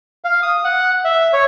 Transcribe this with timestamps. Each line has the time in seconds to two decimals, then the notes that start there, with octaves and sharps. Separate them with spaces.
0.24 F5
0.42 D#6
0.64 F#5
1.05 E5
1.33 C#5